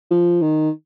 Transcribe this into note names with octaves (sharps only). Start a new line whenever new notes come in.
F3
D#3